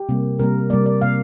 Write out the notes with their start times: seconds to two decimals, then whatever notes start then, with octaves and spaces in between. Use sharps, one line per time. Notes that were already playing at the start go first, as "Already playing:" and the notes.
Already playing: G4
0.09 C3 G3 A#3
0.39 C3 G3 A#3 A#4
0.70 C3 G3 A#3 D5
0.86 D5
1.01 C3 A#3 F5